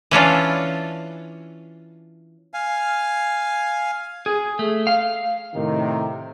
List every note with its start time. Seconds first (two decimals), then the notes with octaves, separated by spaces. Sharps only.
0.11 E3 C#4 D4 F4
2.54 F5 G#5
4.26 G#4
4.59 A3
4.87 F5
5.55 A2 C3 D#3